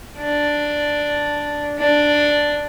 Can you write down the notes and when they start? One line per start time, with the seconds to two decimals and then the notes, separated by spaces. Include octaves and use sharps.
0.18 D4
1.79 D4